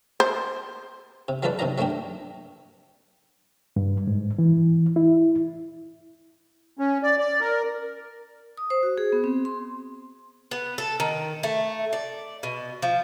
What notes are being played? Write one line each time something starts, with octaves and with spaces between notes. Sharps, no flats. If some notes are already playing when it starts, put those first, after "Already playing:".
C5
C3
F#3 G#3 F4 A4 B4 D5
C3 D#3 F#3 D#5 A#5
F#3 A3 A#3 D4 G4
G2
G#2
E3
E4
C#4
D5
D5
A#4
D#6
C5
F#4
G#4
B3
C4
C6
B3
A4
D#3
A3
D5
B2
F3